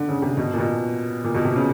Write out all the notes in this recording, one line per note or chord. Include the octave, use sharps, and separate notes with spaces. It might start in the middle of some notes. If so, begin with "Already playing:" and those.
Already playing: D3
C#3
C3
B2
A#2
B2
A#2
B2
C3
C#3